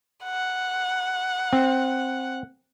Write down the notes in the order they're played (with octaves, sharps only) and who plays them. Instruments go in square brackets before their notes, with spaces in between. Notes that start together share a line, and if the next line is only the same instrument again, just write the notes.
[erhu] F#5
[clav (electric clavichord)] C4